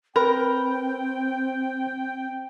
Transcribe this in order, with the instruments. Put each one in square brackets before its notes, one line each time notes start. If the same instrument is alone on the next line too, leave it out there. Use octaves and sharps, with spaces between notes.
[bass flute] C4 [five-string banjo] A#4 [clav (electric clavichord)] B4 [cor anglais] G5